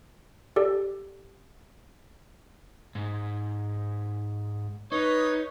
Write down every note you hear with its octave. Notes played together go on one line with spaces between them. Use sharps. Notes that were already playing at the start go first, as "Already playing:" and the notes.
G4 A4 D5
G#2
D#4 B4 C#5